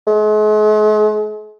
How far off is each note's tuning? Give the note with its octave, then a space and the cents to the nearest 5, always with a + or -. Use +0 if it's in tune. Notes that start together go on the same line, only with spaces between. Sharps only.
G#3 +45